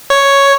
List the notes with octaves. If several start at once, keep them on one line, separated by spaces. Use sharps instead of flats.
C#5